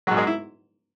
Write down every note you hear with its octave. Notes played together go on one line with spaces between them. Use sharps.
G#2 F#3 F#4
G#3 G#4
E4